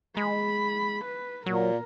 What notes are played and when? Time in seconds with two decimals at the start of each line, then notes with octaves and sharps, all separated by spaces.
0.17 G#3 B5
1.05 B4
1.46 A#2 F#3 A#4